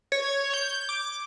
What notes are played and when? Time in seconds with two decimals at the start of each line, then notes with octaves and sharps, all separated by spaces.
0.12 C#5
0.54 G6
0.89 D6